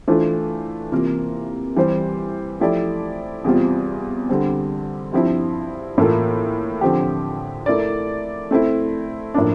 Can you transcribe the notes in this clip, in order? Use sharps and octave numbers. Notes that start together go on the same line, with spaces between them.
E3 A3 D4 F4 C5
C3 E3 A#3 F4 A#4
E3 G3 C4 G4 C5
F3 A3 E4 G4 D5
E2 C3 G3 C4 F4
D3 G3 C4
G2 F3 C4 E4
A2 E3 A#3 F4 A4
D3 F3 C4 G4
A3 E4 A#4 D5
A3 C4 E4
A2 F3 A#3 D4